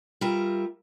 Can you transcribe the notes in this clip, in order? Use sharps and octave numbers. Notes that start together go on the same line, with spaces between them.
G3 F4 A#4 E5